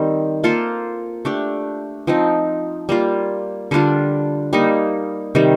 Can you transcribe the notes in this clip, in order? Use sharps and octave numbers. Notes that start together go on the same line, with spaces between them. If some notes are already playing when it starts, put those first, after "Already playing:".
Already playing: D#3 G3 C4
A#3 F4 A4 C5
A3 D4 G4
F3 C4 D#4
G3 A#3 F4
D3 G3 D4 F4
G3 A#3 D#4
C3 D#3 G3